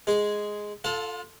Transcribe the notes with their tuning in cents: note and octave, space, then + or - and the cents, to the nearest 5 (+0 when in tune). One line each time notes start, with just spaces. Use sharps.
G#3 +0 G#4 +0
F4 +0 A4 +0 F5 +45